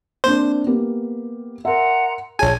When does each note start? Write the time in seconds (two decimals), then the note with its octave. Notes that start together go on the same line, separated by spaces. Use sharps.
0.24 A#3 C4 D4 C5
0.67 A#3 B3 G4
1.65 A#4 E5 F#5 A#5 C6
2.39 A#1 G#4 C#5 G#5 A5